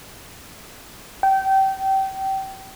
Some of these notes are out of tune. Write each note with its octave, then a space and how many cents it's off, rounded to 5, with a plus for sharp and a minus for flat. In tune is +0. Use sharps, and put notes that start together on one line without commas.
G5 -25